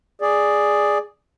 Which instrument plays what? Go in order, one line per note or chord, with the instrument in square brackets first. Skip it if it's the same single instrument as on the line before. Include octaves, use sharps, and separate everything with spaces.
[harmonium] G#4 D5